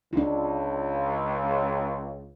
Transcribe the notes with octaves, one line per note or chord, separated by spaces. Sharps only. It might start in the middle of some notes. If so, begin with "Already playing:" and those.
C#2 D4 F4